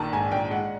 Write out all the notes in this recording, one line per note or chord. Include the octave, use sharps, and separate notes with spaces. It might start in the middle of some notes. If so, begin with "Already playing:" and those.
Already playing: A#1 D#3 A5 A#5
G#2 G#5
A#1 G5
G#3 F#5